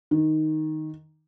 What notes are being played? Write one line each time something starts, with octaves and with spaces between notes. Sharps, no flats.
D#3